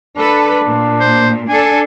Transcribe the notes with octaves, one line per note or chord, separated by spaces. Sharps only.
D4 A4 B4
A#2
C5
D4 A4 G#5